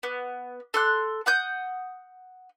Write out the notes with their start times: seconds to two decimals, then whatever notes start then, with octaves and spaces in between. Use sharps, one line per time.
0.03 B3
0.74 A4 C6 F#6
1.26 F#5 D#6 G6